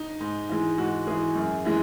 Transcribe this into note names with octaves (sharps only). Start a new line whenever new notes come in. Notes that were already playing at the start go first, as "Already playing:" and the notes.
Already playing: D#4
G#2
E3 G#3
G#2 F#4
E3 G#3 G#4
F#2
E3 G#3